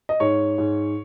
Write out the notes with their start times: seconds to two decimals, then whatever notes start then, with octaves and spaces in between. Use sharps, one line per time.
0.09 D#5
0.20 G#2 C#5
0.58 G#2